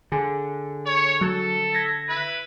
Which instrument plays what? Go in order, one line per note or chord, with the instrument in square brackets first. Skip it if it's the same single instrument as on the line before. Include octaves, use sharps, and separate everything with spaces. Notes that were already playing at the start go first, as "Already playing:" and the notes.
[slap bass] D3 [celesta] G#4 G#5
[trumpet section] C#5
[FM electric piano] F#3 [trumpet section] A4
[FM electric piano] G#6 A#6 [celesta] B6
[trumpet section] E4 B4